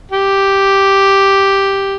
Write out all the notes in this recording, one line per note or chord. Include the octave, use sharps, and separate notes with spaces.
G4